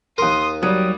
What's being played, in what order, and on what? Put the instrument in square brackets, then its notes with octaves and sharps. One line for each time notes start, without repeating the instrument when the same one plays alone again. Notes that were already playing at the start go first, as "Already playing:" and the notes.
[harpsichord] D#2 A#4 [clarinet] C6 [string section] D#6
[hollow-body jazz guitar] F#3 [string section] G3 [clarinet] D#6